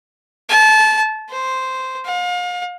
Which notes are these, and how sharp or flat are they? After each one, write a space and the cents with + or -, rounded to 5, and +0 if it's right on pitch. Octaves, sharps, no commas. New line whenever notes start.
A5 -25
C5 -5
F5 +35